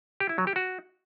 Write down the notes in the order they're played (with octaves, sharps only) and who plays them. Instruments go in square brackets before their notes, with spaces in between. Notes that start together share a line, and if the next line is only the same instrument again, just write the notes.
[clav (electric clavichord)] G4
E4
F#3
G4
F#4